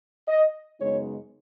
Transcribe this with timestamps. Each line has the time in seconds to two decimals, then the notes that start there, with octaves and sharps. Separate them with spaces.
0.27 D#5
0.79 F#2 C#3 G#3 B3 D#4 C#5